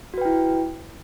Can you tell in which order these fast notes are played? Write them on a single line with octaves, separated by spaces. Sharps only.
F#4 B4 G5 E4